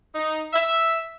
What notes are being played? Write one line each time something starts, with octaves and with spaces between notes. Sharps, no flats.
D#4
E5